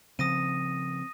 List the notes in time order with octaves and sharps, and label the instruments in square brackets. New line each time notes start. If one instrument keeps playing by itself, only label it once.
[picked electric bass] C#3 F3 [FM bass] C4 [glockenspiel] D#6 A#6 D#7